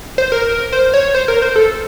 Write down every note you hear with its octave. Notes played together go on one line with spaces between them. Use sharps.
C5
A#4
C5
C#5
C5
A#4
C5
A4